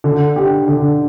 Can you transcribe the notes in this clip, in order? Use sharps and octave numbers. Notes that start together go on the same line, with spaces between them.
D3
G4
D3